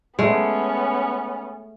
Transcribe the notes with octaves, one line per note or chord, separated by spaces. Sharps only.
G#3 A3 B3 C#4